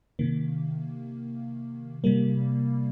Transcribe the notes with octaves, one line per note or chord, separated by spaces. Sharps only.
C3 D#3 A#3
C3 G3 A#3